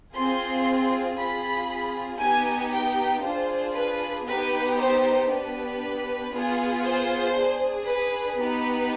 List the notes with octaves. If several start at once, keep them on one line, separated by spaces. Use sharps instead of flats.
C4 F4 G#4 C6
C4 F4 G#4 B5
B3 D#4 G4 G#5
G5
D4 F4 G#4 C5
B4
B3 D#4 G4 B4
C5
B3 D4 G4 B4
B3 F4 G#4
C5
D4 G#4
B4
B3 D#4 G4 B4